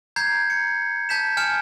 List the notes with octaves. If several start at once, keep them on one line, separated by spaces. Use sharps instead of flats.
A#5 G6 G#6 C7
C#7
A5 G6 B6 E7
G#5 F6 C#7 E7